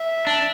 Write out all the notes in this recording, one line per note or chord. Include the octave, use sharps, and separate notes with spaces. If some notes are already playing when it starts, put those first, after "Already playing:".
Already playing: E5
D4